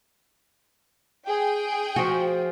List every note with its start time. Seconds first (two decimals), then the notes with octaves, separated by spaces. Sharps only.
1.27 G#4 G5
1.96 F3 F#4